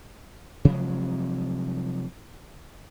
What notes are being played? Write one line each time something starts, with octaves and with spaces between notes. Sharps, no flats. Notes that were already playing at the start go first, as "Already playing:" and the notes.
C3 F3 F#3 G#3